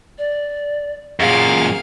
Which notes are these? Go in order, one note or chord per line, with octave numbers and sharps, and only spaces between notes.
D5
F#2 A#2 G#4 F5